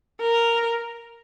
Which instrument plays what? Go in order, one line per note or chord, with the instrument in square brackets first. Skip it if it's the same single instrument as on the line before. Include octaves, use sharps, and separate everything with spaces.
[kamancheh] A#4